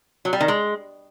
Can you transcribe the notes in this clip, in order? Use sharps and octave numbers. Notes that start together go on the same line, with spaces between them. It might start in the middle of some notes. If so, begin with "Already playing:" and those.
F#3
G3
D#3
G#3